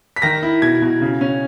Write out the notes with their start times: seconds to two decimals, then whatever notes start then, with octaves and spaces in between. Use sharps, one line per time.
0.16 B6
0.22 D#3 A#6
0.43 E4
0.62 B2 G#6
0.82 B2
1.01 C#3
1.21 C#4